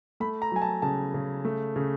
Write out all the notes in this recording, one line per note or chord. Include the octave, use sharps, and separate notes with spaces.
A3 B5
A#5
F#3 G#5
A5
C#3 A5
C#3
A3
C#3